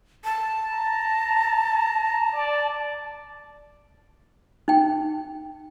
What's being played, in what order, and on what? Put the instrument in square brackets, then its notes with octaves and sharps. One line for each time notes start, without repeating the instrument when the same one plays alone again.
[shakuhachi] A5
[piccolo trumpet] A#5
A#5
D5
[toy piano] D#4 G5